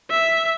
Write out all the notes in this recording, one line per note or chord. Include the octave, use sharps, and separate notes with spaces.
E5